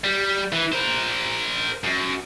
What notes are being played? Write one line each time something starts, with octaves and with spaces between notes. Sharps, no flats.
G3
E3
A#4 C5
F#2